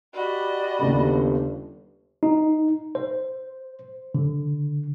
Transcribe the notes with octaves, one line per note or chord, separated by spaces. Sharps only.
F#4 G4 D5 D#5 B5
G1 D#2 C#3
D#4
C5
D3